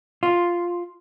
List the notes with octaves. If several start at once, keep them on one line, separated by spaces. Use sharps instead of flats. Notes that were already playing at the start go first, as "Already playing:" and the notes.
F4